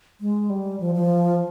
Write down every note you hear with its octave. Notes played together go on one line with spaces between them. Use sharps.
G#3
G3
F3
F3